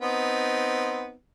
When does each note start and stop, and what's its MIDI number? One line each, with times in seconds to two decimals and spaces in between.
0.01 1.13 59
0.01 1.13 60
0.01 1.13 63